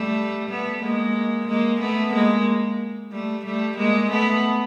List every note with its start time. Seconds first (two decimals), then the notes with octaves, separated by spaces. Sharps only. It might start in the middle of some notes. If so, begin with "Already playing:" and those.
Already playing: G3 A3
0.50 A3 B3
0.82 G#3 A#3
1.47 G#3 A#3
1.80 A3 B3
2.13 G#3 A#3
3.11 G3 A3
3.45 G3 A3
3.77 G#3 A#3
4.10 A3 B3